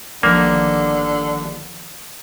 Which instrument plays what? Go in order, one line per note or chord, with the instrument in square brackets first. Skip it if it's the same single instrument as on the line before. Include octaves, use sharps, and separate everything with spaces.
[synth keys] G1 D#3 F3 [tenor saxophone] D3 [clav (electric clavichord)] A#3